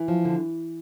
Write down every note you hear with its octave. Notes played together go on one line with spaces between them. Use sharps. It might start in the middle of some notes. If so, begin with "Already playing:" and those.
Already playing: E3
F3
D3